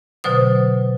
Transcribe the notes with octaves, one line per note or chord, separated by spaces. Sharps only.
B2 D3 F#3 C5 D#6